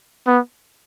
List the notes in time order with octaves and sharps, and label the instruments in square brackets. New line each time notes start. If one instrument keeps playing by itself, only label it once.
[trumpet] B3